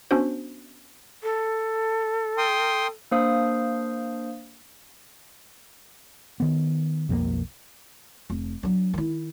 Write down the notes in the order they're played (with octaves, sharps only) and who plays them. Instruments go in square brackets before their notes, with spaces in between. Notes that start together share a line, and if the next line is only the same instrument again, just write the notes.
[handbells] B3 C#4 D4 F#4 C5
[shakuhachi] A4
[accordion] G5 C6 D#6
[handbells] A#3 D4 C5 F5 D#6
[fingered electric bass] D#3 B3
B1 F2 E3 A#3
[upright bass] F1
F#3 D4
D#3 E4